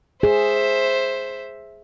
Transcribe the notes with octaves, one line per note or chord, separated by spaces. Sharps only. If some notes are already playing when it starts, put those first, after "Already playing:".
G#4 C5 E5